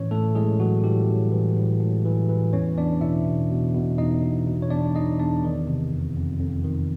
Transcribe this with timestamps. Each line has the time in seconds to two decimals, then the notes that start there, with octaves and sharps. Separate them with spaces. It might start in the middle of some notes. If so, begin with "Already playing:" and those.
Already playing: A2 E3 C#4 C#5
0.11 A2 A3 A4
0.35 A2 G#3 G#4
0.60 E3 F#3 F#4
0.84 A2 G3 G4
1.08 A2
1.32 E3
1.57 A2
1.81 A2
2.05 E3
2.29 E3
2.53 E2 C#4 C#5
2.77 E2 D4 D5
3.01 B2 E4 E5
3.27 B2
3.50 B2
3.75 B2
3.98 E2 D#4 D#5
4.23 B2
4.47 B2
4.62 C#5
4.70 E2 D4 D5
4.95 E2 D#4 D#5
5.19 E2 D4 D5
5.44 D#3
5.67 C3
5.92 F2
6.16 F2
6.41 F2
6.65 D#3